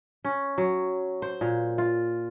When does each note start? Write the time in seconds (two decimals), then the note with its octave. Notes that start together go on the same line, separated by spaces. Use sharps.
0.25 C#4
0.58 F#3
1.22 C5
1.41 A#2
1.78 F4